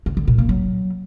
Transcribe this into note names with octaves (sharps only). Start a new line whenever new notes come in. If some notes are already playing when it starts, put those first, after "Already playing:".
D3
D3
A#2
A#3
F#3